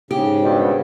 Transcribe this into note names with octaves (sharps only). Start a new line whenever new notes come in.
G#2 C#3 G4
G2 B2